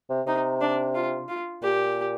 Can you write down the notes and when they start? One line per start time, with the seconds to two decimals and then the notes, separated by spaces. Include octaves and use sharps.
0.10 C3
0.27 C3 D#4
0.61 D4
0.95 F4
1.29 F4
1.62 A#2 G4